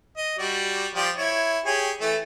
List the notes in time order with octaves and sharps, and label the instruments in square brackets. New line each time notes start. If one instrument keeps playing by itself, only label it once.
[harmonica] D#5
G3 F#4 D5
F3 G4 D5
E4 C#5
G4 G#4 C#5
E3 A3